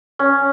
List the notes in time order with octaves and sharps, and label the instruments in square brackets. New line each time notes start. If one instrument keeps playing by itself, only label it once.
[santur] C#4